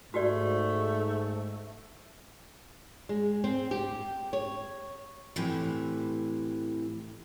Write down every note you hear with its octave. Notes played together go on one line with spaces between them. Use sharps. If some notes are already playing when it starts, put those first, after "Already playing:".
G#2 A3 F#4 G4 D5
G#3
C4
G4
C#5
A2 C3 E3